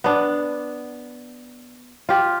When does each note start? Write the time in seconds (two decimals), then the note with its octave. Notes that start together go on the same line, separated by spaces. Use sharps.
0.04 B3 D4
2.09 F4 G4